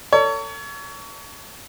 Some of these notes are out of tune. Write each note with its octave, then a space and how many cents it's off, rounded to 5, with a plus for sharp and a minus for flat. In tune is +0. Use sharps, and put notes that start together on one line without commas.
A4 +40 C#5 +30